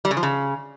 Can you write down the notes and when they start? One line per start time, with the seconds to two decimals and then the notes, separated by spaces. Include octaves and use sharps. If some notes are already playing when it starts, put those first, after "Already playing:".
0.05 G3
0.11 C#3
0.17 F3
0.23 C#3